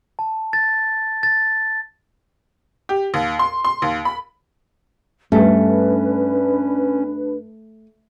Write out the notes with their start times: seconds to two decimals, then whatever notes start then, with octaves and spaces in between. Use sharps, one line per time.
0.19 A5
0.53 A6
1.23 A6
2.89 G4
3.14 D#2
3.39 C6
3.65 C6
3.82 D#2
4.05 B5
5.32 G2 A3 C#4 D4 B4